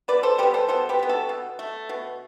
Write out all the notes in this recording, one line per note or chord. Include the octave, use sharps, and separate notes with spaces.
B2 B4 D5
A4 C5
G3 B3 G4 B4
A4 C5
B2 A4 C5
G4 B4
G3 B3
F#4 A4
B2
A3
B2